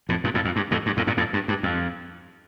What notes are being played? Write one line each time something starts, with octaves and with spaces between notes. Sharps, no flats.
F2 A2
G2 A#2
F2 A2
F2
G2
F2 A2
G2
F2 A2
G2 A#2
F2 A2
G2
G2
F2